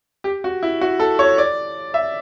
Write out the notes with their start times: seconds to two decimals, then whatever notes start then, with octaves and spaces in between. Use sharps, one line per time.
0.24 G4
0.44 F#4
0.63 E4
0.81 F#4
0.99 A4
1.19 C#5
1.38 D5
1.94 E5